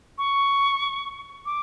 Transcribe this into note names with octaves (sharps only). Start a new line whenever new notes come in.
C#6
D6